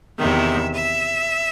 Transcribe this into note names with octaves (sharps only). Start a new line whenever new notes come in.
E2 C3 D#3 E5
E5